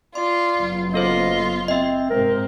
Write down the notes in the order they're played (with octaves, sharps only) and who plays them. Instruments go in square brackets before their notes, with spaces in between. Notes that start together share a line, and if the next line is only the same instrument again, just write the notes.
[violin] F4 [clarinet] D5 [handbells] C6
[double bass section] F#1 F#3 B3
[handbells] A#3 A4 C5 [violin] F4 [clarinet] D#5
[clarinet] C4 [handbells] D#5 E5
[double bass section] G#2 C3 [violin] C4 [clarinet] A#4